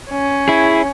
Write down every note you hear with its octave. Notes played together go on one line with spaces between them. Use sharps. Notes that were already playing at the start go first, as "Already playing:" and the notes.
C#4
E4 G#4